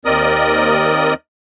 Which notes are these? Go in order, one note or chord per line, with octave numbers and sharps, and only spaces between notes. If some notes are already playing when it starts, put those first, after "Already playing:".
D#2 C4 A#4 D5 D#5 D#6